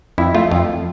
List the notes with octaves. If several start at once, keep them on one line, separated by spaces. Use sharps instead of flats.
F2 E4
A3 F4
F2 F4